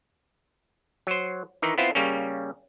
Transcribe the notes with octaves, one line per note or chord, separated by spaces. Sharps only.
F#3 C5
D#3 E3 D#4
B3 C4 E4 F4 C5
C#3 G3 A#3 C#4